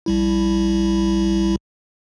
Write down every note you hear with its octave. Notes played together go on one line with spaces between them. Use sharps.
A#1 G3 E4